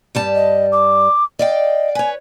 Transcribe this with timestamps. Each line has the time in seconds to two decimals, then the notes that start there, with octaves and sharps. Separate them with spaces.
0.15 G2 G3 A5
0.35 D#5
0.72 D6
1.39 D5 D#5 F5 G5
1.95 B4 C#5 G#5